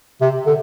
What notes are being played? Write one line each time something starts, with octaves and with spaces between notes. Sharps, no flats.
C3
D3